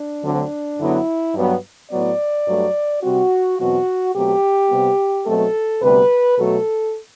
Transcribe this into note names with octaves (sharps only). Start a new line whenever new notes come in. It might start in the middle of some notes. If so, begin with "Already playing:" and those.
Already playing: D4
D2 D3 F#3 A3 C4
F#2 D3 F#3 B3 E4
G2 F#3 B3
A2 F#3 B3 D5
G2 F#3 A3
C3 G3 C4 F#4
E2 B2 F#3 C4 F#4
B2 F#3 A3 C4 G4
C3 G3 B3
B2 F#3 A3 C4 A4
D2 C3 G3 B3 B4
B2 F#3 A3 A4